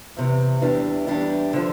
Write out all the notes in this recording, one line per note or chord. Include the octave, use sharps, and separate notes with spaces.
E2 C3 E3
E2 E3 G3 D4 G4
E2 E3 G3 D4 G4
D3 F3